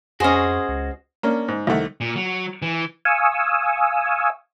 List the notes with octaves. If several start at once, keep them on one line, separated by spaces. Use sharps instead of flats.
F2 C#4 F#4 G#4 C5 D#5
C#2
A#3 C#4 D4
G#2
C2 D#3 A3 F#5
A#2
F#3
E3
F5 G#5 C#6 D#6 E6